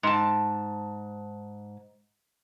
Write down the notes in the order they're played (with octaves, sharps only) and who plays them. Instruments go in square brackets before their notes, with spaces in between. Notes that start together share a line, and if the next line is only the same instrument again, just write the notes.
[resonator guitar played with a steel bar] G#2 A5